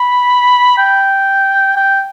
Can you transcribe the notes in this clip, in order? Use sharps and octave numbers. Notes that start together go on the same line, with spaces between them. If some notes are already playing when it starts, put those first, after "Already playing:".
Already playing: B5
G5
G5